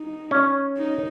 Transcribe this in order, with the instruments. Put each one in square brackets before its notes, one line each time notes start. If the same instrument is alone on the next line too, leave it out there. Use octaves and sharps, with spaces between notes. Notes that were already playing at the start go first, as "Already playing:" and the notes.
Already playing: [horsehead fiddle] D#4
[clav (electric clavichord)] C#4
[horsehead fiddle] D#4